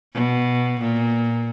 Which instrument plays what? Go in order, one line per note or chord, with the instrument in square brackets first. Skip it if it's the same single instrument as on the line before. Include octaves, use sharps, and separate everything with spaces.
[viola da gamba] B2
A#2